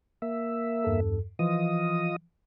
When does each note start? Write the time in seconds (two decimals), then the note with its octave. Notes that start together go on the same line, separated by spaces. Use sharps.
0.22 A#3 E5
0.84 E2 G2 A4
1.39 E3 F3 F4 D#5 D#6